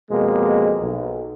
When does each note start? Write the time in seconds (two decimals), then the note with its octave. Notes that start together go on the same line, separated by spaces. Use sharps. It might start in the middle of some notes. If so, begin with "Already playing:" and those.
0.11 F2 B2 G#3 A#3
0.81 B1